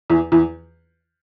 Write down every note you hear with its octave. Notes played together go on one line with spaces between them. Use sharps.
E2 E3
E2 E3